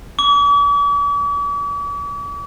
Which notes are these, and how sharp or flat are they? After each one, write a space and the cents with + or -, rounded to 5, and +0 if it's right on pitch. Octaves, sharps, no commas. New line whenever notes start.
D6 -45